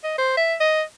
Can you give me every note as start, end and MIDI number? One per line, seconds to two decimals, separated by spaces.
0.04 0.18 75
0.18 0.33 72
0.37 0.55 76
0.60 0.82 75